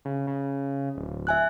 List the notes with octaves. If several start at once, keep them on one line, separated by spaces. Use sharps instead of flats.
C#3
C#3
D1
E5 G#5 F#6